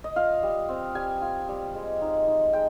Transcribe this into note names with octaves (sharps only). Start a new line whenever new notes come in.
D#5
F4 F5
G3
C4
G3 G#5
F4
G3
G#3
D#4
D#4
G#3 G5